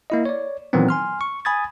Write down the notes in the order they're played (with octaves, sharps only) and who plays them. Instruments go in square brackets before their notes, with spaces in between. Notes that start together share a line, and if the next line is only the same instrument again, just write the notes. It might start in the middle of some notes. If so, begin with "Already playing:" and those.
[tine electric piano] A#3 E4 D#5
C#5 D5
A#2 D#3 E3 F#3 B3 C4
G#5 C6 F6
C#6
G#5 B5 D#6 G#6 A6